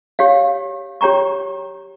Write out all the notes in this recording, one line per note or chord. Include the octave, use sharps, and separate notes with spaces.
G4 C#5 F5
G4 C#5 G5 A#5 C#6